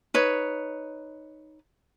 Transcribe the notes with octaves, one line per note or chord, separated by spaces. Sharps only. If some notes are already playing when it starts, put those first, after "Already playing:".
D#4 B4 C#5